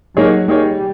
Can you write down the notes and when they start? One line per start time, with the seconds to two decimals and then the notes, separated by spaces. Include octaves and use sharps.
0.17 F#3 A#3 D#4 G#4 C#5
0.48 G3 A#3 D#4 G#4 C#5